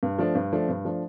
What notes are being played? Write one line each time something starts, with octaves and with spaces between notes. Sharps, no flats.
G2
F3 A3 D4
G2
F3 A3 D4
G2
F3 A3 D4